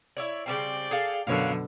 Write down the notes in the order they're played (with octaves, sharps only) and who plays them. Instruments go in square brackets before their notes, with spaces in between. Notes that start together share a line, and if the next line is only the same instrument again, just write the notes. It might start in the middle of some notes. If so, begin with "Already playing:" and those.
[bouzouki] E4 C#5 D5
[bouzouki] C#3 G3 C4 [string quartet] D5 G5
[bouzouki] G#4 A4 F5
[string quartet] F#2 B2 D3 [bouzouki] A#4 C#5 F5